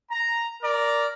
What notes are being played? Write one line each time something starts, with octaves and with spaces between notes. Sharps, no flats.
A#5
A#4 D5 A#5